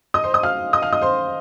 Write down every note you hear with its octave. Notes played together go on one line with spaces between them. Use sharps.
D#5 D#6
C5 C6
D#5 D#6
F5 F6
D#5 D#6
F5 F6
D#5 D#6
C5 C6